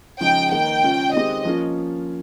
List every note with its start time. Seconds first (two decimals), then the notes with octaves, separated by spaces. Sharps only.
0.20 C#3 F3 G#3 D#4 G5
0.52 D#3 A#3 D#4 G5
0.83 C#3 G#3 C#4 F4
1.13 D#3 G#3 C4 G4 D#5
1.45 F3 A#3 C#4 F4